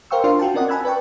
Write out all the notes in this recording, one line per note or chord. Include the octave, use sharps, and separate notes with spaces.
A#4 C5 F5 G5 C#6 E6
D4 F4 A#4 D5 F5 C6
F4 F#4 G5 A5
C4 C#4 A#4 D5 D#5 F#5
G#5 A5 B5 E6 F#6 G#6
B4 D5 G5 A5 C#6